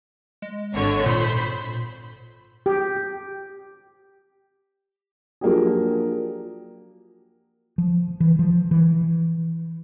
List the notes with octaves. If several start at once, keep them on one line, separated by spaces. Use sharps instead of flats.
G#3
G#1 D3 C#5
A#2 C5 B5
G4
F3 F#3 A#3 D4 G4 G#4
F3
E3
F3
E3